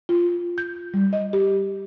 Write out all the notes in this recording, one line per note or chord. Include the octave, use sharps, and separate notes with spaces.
F4
G6
G3
D#5
G4